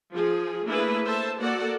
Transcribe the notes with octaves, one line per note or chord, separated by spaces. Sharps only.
F3 G#4
A3 A#3 D4 E4 G#4 B4
A4 C5 E5 A5
A#3 F#4 A4 D5 F#5